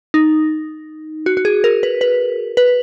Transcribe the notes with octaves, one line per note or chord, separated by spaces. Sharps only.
D#4
F#4
F#4
G#4
A#4
B4
B4
B4